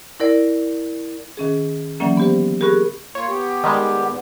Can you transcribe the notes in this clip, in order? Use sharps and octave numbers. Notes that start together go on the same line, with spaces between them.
E4 A#4 D5
D#3 C#4 G#4
D3 E3 F#3 A#3 C#4
B3 G4 C5
G4 G#4 A#4 B5 C#6 F#6
A#3 F4 C#5
B3 G4
D#3 G3 G#3
A#2 B3